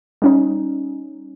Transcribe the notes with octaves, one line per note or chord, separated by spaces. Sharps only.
G3 C#4 D#4